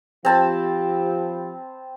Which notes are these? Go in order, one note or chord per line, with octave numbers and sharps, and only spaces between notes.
F3 C4 G4 A5 B5